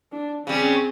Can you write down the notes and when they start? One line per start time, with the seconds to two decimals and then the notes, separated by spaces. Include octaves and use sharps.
0.13 D4
0.47 C#3 G3 C4 G#4